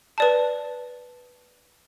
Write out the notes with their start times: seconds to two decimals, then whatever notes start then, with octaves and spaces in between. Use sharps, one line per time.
0.18 B4 D5 A5